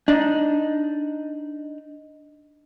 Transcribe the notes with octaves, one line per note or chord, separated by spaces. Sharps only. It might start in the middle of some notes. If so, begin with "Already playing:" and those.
D4 D#4